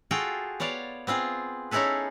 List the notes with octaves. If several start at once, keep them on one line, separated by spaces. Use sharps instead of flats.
F4 F#4 G#4 A4 G5
B3 C#5 D5 F5 A5
B3 C4 F4 G#4
C#4 D#4 E4 G#4 A4 B4